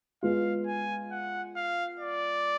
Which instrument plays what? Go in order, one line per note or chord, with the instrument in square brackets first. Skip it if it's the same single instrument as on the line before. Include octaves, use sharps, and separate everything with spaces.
[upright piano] G#3 B3 F4 [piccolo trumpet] F5
[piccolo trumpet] G#5
F#5
F5
D5